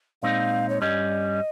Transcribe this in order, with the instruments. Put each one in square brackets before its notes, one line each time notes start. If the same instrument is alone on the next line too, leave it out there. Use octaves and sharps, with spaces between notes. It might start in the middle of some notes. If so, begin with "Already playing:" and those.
[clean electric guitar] A#2 G#3 C4 D#4 [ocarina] F5
[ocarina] C#5
[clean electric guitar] G2 G3 C#4 [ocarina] D#5